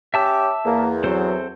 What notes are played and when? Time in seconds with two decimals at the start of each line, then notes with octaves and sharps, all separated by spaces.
0.14 C#4 G4 E5 A5 D6 E6
0.65 E2 A#3
1.04 F#3 C4 A4 C5